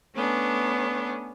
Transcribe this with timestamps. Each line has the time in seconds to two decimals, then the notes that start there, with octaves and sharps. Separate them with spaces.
0.16 A3 B3 C#4 D4